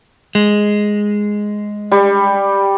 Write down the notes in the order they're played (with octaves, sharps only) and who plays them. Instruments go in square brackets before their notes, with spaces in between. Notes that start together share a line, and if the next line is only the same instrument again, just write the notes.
[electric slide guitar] G#3
[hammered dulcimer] G3